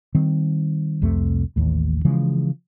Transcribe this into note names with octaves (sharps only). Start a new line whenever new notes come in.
D#3 G3 C4
C2 F2 C3 A3
A1 D#2 A2
C#3 E3 F3 G#3